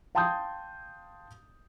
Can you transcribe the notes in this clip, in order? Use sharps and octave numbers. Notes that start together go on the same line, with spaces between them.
F5 G5 A5 C6 D#6 G6